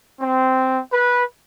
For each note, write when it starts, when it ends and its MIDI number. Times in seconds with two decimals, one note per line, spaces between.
0.21 0.80 60
0.92 1.24 71